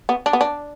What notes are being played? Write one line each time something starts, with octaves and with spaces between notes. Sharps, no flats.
B3
D4
B3
D4